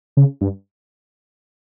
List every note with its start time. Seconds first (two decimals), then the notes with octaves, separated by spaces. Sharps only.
0.17 C#3
0.41 G2